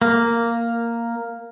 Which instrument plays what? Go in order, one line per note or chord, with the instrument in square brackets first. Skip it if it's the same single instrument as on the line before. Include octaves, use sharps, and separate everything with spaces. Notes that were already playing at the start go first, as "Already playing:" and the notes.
[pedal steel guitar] A#3